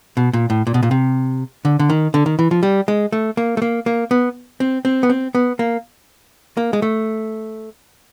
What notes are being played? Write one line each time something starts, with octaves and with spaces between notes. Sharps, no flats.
B2
A#2
A2
A#2
B2
A#2
C3
D3
D3
D#3
D3
D#3
E3
F3
G3
G#3
A3
A#3
A3
A#3
A#3
B3
C4
C4
B3
C4
B3
A#3
A#3
G#3
A3